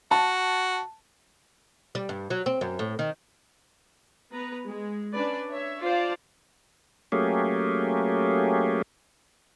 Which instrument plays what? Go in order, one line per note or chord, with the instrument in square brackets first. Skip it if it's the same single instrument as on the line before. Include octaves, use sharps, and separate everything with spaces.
[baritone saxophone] F#4 [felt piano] A5
[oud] G3
G2
F#3
C4
F#2
A2
D#3
[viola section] B3 B4 A#5
G#3
C#4 D4 B4 D5
C#5 E5
F4 C5 D5 F5 A5
[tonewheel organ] F#3 A3 A#3 C#4 G4 G#4